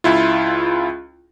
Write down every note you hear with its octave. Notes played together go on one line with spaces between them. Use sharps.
C#2 E4 F4